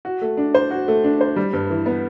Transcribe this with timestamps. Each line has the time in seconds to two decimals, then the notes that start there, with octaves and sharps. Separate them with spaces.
0.05 F#4
0.21 A3
0.37 D4
0.54 C5
0.71 F#4
0.88 A3
1.04 D4
1.21 C5
1.36 G3
1.53 G2
1.70 E3
1.86 B3